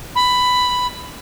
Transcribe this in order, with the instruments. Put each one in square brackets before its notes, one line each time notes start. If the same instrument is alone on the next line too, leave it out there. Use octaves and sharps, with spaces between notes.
[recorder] B5